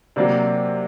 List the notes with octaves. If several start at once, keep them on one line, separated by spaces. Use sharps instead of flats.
C3 F#3 A#3 D4